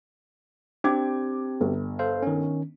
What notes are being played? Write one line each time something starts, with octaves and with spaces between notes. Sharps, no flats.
C4 D4 G4 D6 G#6
G1
A4 C5 F5
D#3 C#4